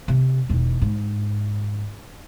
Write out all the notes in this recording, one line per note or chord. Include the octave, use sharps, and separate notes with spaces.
C3
E1 D#3
G#2